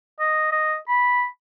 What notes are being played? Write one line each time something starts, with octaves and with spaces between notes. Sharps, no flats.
D#5
D#5
B5